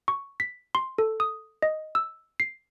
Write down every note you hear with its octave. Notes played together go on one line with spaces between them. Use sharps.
C#6
B6
C6
A4
D#6
D#5
E6
C7